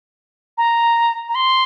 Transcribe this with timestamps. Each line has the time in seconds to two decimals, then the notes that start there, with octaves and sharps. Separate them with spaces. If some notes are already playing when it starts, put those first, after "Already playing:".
0.58 A#5
1.29 A#5
1.35 C6